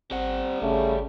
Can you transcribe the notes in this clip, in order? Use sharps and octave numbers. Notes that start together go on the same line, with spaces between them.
G#1 G3 C4 F#5
G#1 C#3 A3